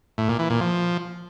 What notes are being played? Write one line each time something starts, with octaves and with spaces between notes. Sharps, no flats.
A2
A#2
E3
A#2
F3